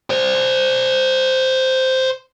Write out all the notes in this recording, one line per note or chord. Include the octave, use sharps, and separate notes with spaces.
C5 D5